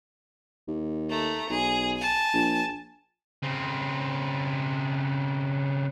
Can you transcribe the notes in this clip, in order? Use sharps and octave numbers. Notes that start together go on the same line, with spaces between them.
D#2
A3 A#5
B1 G#4
G#5 A5
A#1
C#3 C4